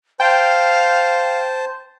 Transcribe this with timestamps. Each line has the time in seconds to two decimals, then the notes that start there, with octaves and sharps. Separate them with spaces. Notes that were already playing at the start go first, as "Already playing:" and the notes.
0.20 C5 F5 G5 A5